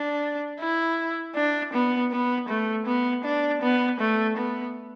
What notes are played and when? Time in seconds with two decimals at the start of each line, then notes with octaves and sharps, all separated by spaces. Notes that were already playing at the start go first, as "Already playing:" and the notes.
Already playing: D4
0.60 E4
1.36 D4
1.73 B3
2.12 B3
2.49 A3
2.86 B3
3.25 D4
3.62 B3
4.00 A3
4.37 B3